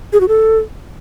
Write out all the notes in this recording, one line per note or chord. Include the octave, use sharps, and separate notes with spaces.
G#4
F#4
A4